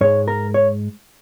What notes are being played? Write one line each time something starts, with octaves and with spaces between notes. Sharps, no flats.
G#2 G#3 C#5
A#4
C#5